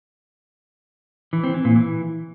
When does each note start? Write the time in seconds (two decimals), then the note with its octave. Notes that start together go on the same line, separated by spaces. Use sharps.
1.33 E3
1.44 C4
1.54 E3
1.65 A#2
1.76 E3